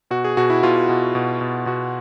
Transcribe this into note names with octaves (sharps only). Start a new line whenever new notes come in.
B2 F#4
G#4
B2 F#4
E4
B2 F4
B2
B2
B2
B2 F#4